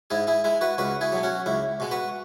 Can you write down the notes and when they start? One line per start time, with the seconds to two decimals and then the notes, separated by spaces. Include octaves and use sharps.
0.10 G#2 E4 G#4
0.27 E4 G#4
0.44 G#3 E4
0.61 F#4 B4
0.78 C#2 F#4 B4
1.01 E4 G#4
1.12 B2 F#3
1.23 C#4 F#4
1.46 C#2 E4
1.80 B2 G#3
1.91 F#4 B4